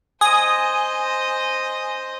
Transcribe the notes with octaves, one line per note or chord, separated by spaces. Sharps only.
C5 D#5 G#5 D#6